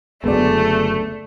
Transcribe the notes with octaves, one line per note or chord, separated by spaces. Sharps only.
F#1 D2 G#3 A3 B3 D5